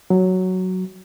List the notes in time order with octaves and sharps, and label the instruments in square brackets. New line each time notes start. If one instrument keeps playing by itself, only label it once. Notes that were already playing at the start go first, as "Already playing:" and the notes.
[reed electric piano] F#3